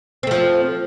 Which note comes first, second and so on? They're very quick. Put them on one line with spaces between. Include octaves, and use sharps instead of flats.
C4 A3 F3